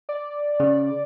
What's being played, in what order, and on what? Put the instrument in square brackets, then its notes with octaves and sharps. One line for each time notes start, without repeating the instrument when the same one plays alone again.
[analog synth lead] D5
[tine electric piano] C#3